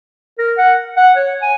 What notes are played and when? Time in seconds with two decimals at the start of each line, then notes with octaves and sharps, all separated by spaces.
0.38 A#4
0.58 F#5
0.97 F#5
1.16 C#5
1.42 G#5